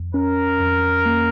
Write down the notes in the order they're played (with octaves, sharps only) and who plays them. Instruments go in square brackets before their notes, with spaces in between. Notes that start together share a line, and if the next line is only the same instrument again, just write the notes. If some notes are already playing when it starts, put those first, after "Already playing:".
Already playing: [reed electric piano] F2
[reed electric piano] C#4 [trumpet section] A#4
[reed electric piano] F2
A#3